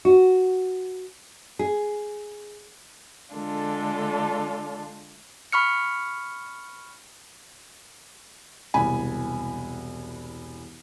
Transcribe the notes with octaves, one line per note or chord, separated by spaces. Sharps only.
F#4
G#4
D3 G#3 D4 F4 A4
B5 C#6 F6 C#7
E1 C2 G#5 B5